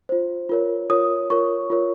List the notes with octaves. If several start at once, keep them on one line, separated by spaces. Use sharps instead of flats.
F4 C5
F4 A#4 C#5
F4 A#4 C#5 D#6
F4 A#4 C#5 C#6
F4 A#4 C#5